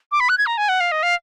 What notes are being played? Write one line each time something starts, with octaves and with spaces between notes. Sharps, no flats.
D6
B5
F#6
G#6
A#5
G#5
F#5
F5
D#5
F5